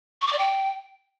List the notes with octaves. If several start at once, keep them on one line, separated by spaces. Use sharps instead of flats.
C#6
D6
D5
G5